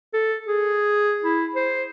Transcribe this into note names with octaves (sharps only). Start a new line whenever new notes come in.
A4
G#4
E4
C5